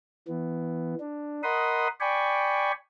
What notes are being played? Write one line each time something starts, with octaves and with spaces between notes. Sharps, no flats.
E3 B3
D4
A#4 D#5 F#5 B5 C6 D#6
D5 G5 G#5 B5 C#6